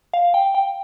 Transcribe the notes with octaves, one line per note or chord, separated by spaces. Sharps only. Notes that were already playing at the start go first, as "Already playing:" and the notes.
F5
G5
G5